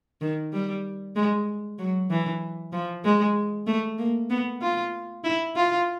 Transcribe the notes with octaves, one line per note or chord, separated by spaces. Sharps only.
D#3
G3
G#3
F#3
E3
F3
G#3
A3
A#3
B3
F4
E4
F4